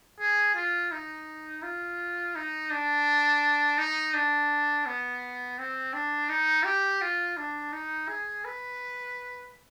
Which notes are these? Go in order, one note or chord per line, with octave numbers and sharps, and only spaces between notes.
G#4
F4
D#4
F4
D#4
D4
D#4
D4
B3
C4
D4
D#4
G4
F4
D4
D#4
G#4
B4